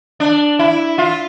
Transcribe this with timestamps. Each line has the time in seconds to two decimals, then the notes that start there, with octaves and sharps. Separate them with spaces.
0.20 D4
0.59 E4
0.98 F4